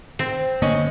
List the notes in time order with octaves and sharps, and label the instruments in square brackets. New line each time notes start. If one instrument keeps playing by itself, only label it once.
[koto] C4
[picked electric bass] A2 D3 A#3 [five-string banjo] G#3 C#4 D#5